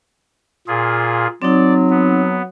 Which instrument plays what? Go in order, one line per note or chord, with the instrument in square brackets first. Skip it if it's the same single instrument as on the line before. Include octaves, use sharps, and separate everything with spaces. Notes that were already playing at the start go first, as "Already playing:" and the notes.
[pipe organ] A#2 F4 G#4
[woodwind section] F#3 [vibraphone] C4 D#4 [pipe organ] D5
[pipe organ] B3